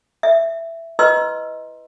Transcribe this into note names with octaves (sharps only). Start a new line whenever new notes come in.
E5
E4 B4 D#5 C6 E6